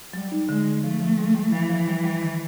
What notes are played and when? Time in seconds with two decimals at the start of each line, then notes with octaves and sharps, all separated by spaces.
0.14 F#3 G3
0.32 D#4
0.49 D3 G#3
0.66 D3
0.84 F3 A3
1.00 F3
1.18 G3
1.35 G3
1.52 E3 F3
1.69 F3
1.88 G3
2.04 G3
2.22 D#3